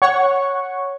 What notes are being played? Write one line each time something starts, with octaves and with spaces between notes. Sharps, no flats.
C#5 F#5 C#6